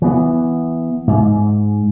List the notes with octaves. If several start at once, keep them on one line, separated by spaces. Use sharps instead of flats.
E3 B3
G#2